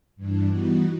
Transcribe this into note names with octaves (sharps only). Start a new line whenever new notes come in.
G2 E3 D4
E3 G3 B3 D#4 F#4